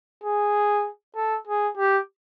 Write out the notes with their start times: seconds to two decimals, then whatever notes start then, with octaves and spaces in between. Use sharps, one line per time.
0.24 G#4
1.15 A4
1.47 G#4
1.77 G4